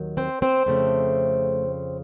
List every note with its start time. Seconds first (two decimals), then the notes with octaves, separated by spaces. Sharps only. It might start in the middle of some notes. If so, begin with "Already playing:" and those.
Already playing: D#2 D#3 F#3
0.17 C4 C5
0.42 C4 C5
0.66 F2 C#3 A3 C4